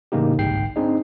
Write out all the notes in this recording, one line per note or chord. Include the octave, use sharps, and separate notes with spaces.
A2 C#3 E3 A#3 D#4 G4
G1 C2 G#2 G5 C7
C4 D4 D#4 G#4 D#5